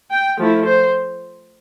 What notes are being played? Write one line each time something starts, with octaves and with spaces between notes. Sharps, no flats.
G5
F3 A3 E4
C5